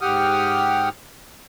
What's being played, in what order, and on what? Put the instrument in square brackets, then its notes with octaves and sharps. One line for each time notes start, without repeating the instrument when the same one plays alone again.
[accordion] G#2 G4 F#5 G5 D#6 F6